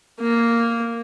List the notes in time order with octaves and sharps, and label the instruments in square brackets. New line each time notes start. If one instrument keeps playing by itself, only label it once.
[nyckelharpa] A#3